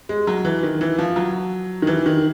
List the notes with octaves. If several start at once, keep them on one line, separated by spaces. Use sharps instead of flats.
G#3
F#3
E3
D#3
E3
F3
F#3
D#3
E3
D#3